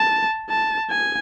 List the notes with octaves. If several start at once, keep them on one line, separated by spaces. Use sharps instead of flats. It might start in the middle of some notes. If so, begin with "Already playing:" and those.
Already playing: A5
A5
G#5